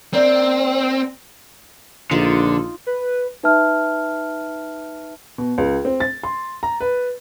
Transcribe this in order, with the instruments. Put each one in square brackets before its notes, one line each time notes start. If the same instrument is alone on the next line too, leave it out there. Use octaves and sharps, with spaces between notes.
[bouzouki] A#3 D4 E5 [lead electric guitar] C4
[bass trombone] A#1 [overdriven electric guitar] D3 [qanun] D#4 F4
[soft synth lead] B4
[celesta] D#4 B4 E5 A5 F6
[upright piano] B2
C#2
C4
A6
C6
A#5
B4